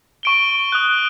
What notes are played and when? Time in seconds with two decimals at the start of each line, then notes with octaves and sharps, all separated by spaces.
0.23 C#6 D7 G7
0.72 D#6 F#6